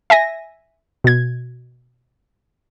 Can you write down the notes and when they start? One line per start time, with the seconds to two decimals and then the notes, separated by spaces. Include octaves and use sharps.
0.10 E5 G#5 A#6
1.04 B2 G#6